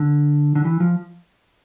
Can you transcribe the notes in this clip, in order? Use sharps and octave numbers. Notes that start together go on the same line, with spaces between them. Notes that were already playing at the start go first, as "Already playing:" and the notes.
Already playing: D3
D3
E3
F3